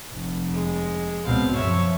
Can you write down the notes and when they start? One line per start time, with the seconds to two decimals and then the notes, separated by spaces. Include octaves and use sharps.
0.13 F1
0.52 G#3
1.25 C#2 B2 C4 F5
1.56 F#2 F3 C#5 E5